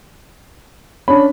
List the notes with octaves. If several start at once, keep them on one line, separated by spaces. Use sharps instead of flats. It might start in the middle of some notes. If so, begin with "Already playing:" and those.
C#4 D4 B5